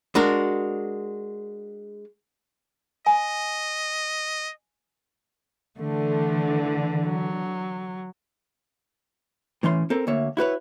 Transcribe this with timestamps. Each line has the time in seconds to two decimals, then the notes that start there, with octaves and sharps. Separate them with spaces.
0.15 G#3 D4 F#4 A#4
3.06 D#5 G#5
5.79 D3 E3 A3
7.05 F#3
9.63 A2 E3 C#4 C6
9.90 C4 A4 A#4
10.07 D2 A#3 C#5 E5
10.37 E4 F#4 B4 C#5